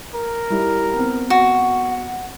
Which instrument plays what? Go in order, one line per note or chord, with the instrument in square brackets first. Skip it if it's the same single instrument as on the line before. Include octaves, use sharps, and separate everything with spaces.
[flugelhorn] A#4
[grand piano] G3 E4
B3 C4
[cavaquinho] F#4
[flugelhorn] F#5